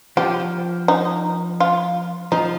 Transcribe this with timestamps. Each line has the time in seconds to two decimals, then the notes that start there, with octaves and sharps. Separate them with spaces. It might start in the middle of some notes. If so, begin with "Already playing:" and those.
0.17 F3 G4
0.88 D#4
1.60 F4
2.32 F3 D#4